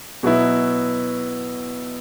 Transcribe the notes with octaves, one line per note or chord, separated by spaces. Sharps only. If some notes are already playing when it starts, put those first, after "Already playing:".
B2 F#3 B3 E4